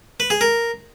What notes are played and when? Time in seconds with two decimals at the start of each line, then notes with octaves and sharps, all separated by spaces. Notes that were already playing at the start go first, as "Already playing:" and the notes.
0.20 B4
0.30 G#4
0.41 A#4